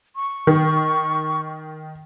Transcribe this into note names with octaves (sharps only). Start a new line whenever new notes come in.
C#6
D#3